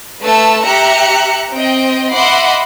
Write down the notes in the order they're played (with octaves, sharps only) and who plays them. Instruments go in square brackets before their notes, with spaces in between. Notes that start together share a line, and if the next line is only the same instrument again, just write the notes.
[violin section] A3 B4 A5 E6
G4 E5 A#5 F#6 C#7
C4 D#5 G5
D#5 E5 F#5 B5 C6 D6